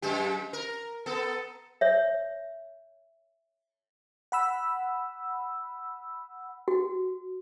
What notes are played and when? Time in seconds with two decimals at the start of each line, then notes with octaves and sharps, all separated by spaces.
0.02 F#2 G#3 G4
0.53 A#4
1.06 B3 A4
1.81 C#5 E5
4.32 F#5 B5 E6
6.68 F#4